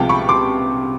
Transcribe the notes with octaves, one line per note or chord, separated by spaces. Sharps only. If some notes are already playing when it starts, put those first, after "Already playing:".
Already playing: C2 C3 F3 G#3 B3 F5 G5 A5
B5 C#6
C6 D6